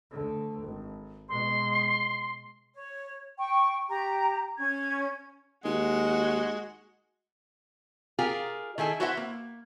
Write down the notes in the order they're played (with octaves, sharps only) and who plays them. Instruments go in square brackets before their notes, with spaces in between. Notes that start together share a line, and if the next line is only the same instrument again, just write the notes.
[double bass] D2 D3
G#1
[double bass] B2 G#3 [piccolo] C6
[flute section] C#5
G5 C#6
G4 A#5
C#4 G#6
[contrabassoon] D#2 [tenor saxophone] G#3 [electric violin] F#4
[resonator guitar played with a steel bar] F4 G4 G#4 A#4
D#3 E4 G#4 A4
E4 F#4 B4 C5 E5 F#5
A#3